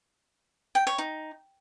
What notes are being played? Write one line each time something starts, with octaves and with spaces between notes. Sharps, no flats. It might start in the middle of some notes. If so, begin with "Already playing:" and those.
G5
C#5
D#4